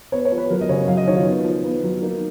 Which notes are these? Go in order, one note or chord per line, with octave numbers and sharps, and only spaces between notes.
B3 C#5
C#5
F3
B4
F#3 A#4
D#5
C#3 C#5
F#3 F5
D#5
D#3 C#5
F4
B3
F3
B3
F#3
A#3 D#4